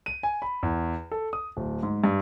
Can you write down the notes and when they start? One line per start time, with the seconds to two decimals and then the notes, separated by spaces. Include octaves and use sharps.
0.06 D#7
0.23 G#5
0.42 B5
0.63 E2
1.11 A4
1.33 D#6
1.57 D1
1.83 G#2
2.04 G2